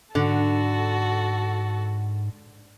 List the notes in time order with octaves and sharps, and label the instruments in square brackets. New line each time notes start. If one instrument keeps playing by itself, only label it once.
[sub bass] G#2 [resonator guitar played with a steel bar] D3 [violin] F#4 A4